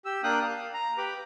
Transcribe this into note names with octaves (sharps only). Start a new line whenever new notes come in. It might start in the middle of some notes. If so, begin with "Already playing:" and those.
G4 E6
A#3 D4 F5 G5 D#6 F#6
F5
A#5
G4 B4 B5 D6